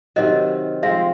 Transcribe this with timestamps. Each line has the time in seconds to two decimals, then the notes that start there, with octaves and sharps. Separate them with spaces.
0.16 C3 D#3 F#3 D#5
0.83 F3 G#3 C4 E5